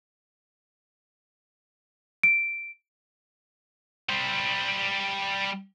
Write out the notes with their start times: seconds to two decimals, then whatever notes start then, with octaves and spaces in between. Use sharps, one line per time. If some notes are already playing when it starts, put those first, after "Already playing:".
2.23 D7
4.09 G3 C5